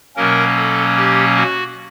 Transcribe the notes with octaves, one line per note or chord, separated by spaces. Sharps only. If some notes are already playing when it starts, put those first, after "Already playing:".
B2 F#3 A#3 C#4 A#4
A4
G4
F#4